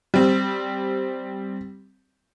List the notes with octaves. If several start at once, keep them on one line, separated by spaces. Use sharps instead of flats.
G3 C4